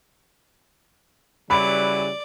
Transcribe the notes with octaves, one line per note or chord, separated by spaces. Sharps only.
C#3 E3 F#3 G3 D5 B5